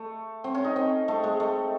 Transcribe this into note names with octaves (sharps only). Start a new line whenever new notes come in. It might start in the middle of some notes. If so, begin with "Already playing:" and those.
Already playing: A3
C4
C#4
D#4
C4
A3
G#3
A3